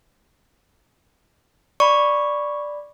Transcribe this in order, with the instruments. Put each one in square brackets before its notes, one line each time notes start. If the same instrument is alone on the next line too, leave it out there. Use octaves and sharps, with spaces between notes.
[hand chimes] D5 B5 [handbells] C#6